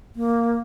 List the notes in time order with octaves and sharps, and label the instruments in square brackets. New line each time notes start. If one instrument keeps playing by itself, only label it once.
[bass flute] A#3